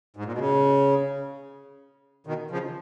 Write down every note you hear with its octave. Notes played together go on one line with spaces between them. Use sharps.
G#2
A#2
B2
C#3
B2 D#3
C#3 F3